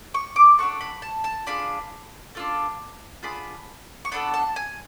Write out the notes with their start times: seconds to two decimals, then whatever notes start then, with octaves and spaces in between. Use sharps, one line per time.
0.14 C#6
0.36 D6
0.58 D4 F#4 A4 C#6
0.81 B5
1.02 A5
1.24 A5
1.47 D4 F4 G#4 B5
2.35 D4 F4 A4
3.23 B3 D4 F4 G#4 B5
4.05 C#6
4.12 B3 D4 F#4 A4 B5
4.34 A5
4.56 G#5